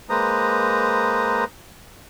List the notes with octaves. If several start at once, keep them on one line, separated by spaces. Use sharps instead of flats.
G#3 A#3 B4 C5 A#5 D#6